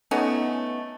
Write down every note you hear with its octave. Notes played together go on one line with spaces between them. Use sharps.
A3 B3 C#4 D#4